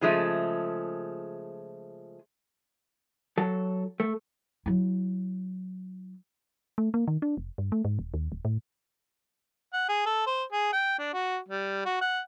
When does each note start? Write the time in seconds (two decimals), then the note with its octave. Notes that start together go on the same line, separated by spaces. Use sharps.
0.01 C#3 F3 G#3 A3
3.38 F#3 A4
4.00 A3
4.66 F#3 E4
6.78 A3
6.94 A#3
7.08 D#3
7.22 D4
7.37 F1
7.58 G2
7.72 A3
7.85 G#2
7.99 D#1
8.14 D#2
8.32 D1
8.45 A2
9.74 F#5
9.89 G#4
10.06 A4
10.27 C5
10.52 G#4
10.73 G5
10.99 D4
11.14 F#4
11.49 G3
11.86 F#4
12.01 F#5